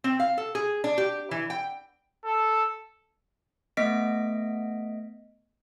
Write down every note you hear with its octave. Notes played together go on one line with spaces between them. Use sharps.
C4
F5
A4
G#4
D4
G4
E3
G5
A4
A3 B3 D#5 B6 D7